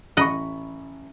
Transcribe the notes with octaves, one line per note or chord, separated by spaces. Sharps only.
A1 D#5 F#5 B5 C#6